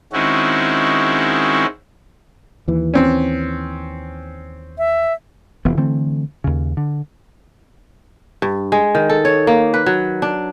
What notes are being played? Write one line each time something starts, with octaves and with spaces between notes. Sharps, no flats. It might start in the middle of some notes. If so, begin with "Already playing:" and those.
D#3 G#3 C4 C#4 E4 F#4
D#2 E3
C4 C#4
E5
F1 E3 B3
D3 E3 A3 C4
D#2 C#3
D3
G2
G#3
D#3
A4
C#5
A#3
B4
F#3
D4